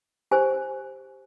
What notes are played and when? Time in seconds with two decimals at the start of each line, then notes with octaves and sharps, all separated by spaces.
0.31 G4 C5 G#5